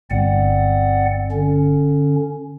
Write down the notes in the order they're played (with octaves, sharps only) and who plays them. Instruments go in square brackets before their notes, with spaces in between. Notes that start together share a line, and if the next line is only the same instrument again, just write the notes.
[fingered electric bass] G1 [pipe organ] C4 D5 F#5
[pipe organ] D3 C#4